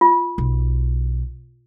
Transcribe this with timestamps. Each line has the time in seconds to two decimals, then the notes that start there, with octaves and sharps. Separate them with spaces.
0.01 F4
0.38 B1